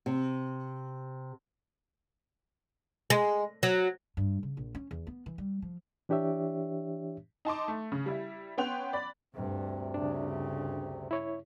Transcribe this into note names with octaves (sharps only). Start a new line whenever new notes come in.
C3
G#3
F#3
G2
C#3
A#1
C#4
E2
B3
E3
G3
F3
E3 D4 G4 C#5 E5
D#4 A5 C6 D6
A3
C#3
G3 E4
B3 C#4 G5 C6 F#6 F7
D5 B5
D2 G2 C3
G2 C#3 D4
E4 C#5